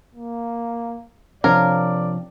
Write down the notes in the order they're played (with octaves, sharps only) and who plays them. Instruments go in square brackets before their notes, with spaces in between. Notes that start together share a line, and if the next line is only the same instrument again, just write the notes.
[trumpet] A#3
[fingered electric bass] C3 F3 C4 [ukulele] D4 C#5 F5 [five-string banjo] A#4 [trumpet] D5